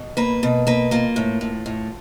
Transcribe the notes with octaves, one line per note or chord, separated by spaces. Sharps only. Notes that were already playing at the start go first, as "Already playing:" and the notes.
Already playing: B2
A#3 B4
B2
A#3 B4
A#3 F4
A2
A2
A2